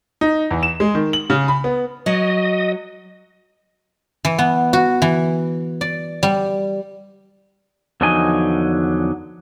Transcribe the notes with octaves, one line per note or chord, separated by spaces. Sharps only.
D#4
E2
E7
G#3
D#3
F#7
C#3
B5
B3
F#3 D#5
E3
B3
F#4
E3
D5
G3
E2 D3 F3 F#3 D#4 G#5